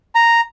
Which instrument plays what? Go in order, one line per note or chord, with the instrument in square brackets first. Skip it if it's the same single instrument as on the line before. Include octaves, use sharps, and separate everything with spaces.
[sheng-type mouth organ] A#5